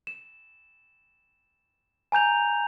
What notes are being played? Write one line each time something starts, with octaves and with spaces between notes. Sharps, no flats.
E7
G#5 A#5 G6 F7